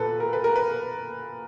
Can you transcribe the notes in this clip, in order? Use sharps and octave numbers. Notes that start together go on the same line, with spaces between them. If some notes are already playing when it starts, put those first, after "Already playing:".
Already playing: A#2 A4 B4
A#4
B4
A#4
B4